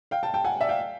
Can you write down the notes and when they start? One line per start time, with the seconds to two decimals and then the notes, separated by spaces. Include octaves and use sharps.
0.11 F5 G5
0.23 G5 A5
0.34 G5 A5
0.45 F#5 G#5
0.61 D5 E5
0.69 F5 G5